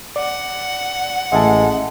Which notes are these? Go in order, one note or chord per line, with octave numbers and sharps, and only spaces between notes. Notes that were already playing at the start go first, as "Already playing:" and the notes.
D5 F#5
A1 G#3 E5 A5